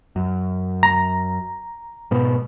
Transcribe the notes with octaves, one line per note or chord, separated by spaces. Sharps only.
F#2
A#5
G#2 B2 B3